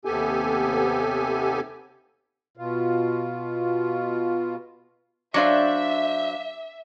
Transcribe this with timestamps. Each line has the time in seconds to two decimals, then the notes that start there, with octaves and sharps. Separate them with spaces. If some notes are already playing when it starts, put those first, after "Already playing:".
0.05 D#2 C3 B3 G4 A4 G#5
2.57 B2 F4
5.34 F#3 D4 C5 E5 F5 D6